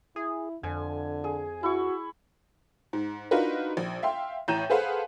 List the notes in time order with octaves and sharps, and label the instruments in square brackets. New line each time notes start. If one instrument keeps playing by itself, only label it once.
[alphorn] E4 [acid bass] G#4
[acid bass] F2 [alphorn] D3 [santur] G#5
[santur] G#4
[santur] E4 C#6 [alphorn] F#4
[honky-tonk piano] G#2
D4 D#4 F4 F#4 A#4 B4
A#1
E5 F5 G5 C6
A1 A2 A#5 G6 D#7 E7
G#4 A4 B4 C5 F5 F#5